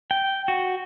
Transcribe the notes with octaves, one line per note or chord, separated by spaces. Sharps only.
G5
F#4